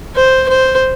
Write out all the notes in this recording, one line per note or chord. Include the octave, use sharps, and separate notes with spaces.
C5
C5